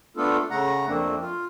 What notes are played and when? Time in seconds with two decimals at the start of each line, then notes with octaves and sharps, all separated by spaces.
0.17 A3 B3 D4 F4 A4
0.51 C#3 A3 F#5 A#5
0.87 F2 A3 A#3 C4 D4
1.21 F4